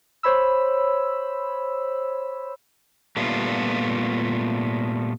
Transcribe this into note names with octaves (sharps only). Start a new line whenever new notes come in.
C5 C#5 B5 E6
A#2 G3 A3 B3 F4